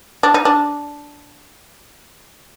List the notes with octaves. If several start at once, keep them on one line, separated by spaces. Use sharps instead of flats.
D4
D#4
D4